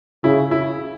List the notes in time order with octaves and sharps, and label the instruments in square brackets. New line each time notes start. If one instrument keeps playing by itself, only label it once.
[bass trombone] C#3 [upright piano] E4
[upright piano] E4